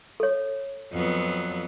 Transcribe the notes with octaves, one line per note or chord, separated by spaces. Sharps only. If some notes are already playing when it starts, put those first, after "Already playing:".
A4 C#5
F2 F#3 B3